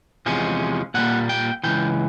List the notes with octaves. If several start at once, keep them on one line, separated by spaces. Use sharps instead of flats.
E2 C3 F3 G#3 C#4
A#2 G3 A#3 F#5
G5
C#2 C#3 E3 G5